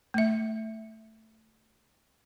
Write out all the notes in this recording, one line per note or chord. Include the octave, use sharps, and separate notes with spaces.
A3 E5